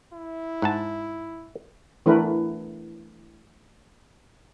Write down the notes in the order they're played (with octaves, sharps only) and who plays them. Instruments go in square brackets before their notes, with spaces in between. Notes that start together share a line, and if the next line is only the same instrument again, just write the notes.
[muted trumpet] E4
[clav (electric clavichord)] G#2 F#5 A5
[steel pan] E3 A3 D4 E4 A#4 B4